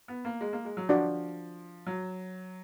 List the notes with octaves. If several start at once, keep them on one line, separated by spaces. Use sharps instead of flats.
B3
A#3
G#3
A#3
G#3
F#3
F3 D4 F#4 D5 F#5
F#3